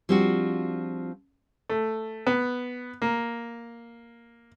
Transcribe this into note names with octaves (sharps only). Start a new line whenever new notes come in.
F3 G3 C4 D4 F4 F#4
A3
B3
A#3